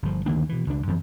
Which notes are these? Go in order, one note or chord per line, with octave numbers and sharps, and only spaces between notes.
G1 F3
D2 D#3 A#3 D4
B2 E3
C#2 D4
F#2 E3 F3 C4